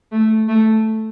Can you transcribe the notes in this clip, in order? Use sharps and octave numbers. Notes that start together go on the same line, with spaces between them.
A3
A3